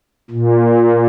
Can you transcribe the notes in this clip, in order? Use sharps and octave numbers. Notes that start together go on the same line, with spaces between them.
A#2